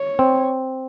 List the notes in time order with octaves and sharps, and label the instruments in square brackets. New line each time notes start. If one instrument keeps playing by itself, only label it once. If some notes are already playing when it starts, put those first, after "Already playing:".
Already playing: [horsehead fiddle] C#5
[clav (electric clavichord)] C4